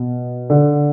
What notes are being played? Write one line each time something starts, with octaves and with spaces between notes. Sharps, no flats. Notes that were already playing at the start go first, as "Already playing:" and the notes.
Already playing: B2
D3